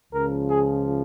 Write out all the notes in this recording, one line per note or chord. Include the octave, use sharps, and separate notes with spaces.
C#2 C#3 F3 A#4
G#4